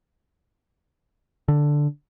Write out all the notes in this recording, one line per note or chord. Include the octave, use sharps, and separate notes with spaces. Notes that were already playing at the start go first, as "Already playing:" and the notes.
D3